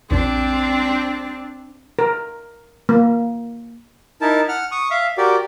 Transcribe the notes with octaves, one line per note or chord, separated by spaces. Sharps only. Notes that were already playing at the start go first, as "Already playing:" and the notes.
A#1 E2 C4 D4
A#4
A#3
D#4 E4 A#4 A5
F#5 F6
C#6 D#6
E5 F5
F#4 G4 A#4 D5